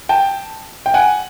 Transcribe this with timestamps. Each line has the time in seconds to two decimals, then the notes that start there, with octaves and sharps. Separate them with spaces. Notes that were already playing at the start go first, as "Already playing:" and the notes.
0.09 G5 A5
0.86 G5
0.94 F#5 G#5